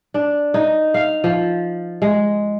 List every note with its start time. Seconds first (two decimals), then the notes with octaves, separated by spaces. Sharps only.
0.14 D4
0.54 D#4
0.94 F5
1.24 F3
2.02 G#3